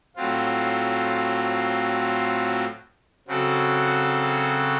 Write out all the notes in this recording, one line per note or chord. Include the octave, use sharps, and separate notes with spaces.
A2 F#3 C4 F4
C#3 F#3 C4 F#4 A4